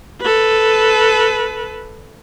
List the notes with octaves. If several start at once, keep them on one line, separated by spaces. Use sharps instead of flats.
A4 B4